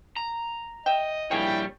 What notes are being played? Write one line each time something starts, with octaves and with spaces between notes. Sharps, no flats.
A#5
D#5 E5 G5
A#1 G3 A#3 E4 G4 G#4 C#5 G5